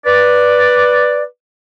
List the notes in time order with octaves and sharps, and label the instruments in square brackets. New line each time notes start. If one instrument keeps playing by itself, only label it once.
[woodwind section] B4 D5